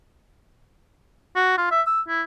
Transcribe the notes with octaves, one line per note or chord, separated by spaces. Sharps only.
F#4
F4
E5
E6
E4